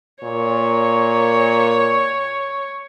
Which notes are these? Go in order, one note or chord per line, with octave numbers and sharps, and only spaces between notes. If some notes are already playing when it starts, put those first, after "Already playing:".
A#2 C#5